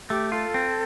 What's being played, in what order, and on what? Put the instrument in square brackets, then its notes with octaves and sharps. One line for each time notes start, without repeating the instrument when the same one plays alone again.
[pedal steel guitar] A3 [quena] G4
[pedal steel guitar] F4 [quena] A4
[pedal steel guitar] C4